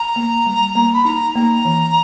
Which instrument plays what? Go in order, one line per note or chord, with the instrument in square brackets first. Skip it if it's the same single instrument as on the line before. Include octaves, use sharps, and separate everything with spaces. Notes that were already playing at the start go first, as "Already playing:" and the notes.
Already playing: [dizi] A#5
[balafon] A#3
G3
A#3
[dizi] B5
[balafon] D#4 [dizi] A#5
[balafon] A#3 [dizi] A#5
[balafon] E3